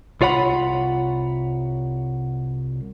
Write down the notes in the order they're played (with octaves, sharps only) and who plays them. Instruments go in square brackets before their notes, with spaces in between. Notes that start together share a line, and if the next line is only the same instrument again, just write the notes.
[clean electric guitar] C2 F4 C#5 F#5 B5